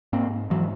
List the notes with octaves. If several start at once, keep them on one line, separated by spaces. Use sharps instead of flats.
G#2 A#3 C4
G#2 E3 F#3